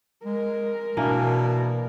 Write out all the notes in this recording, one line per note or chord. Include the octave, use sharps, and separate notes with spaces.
G#3 A#4
B2 E3 A#3 D4